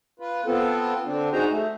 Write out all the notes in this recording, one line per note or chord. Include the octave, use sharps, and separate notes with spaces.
F4 B4
B3 C4 F4 A4
D3 C4 D4
D#4 F#4 G#4 C5 A#5
A3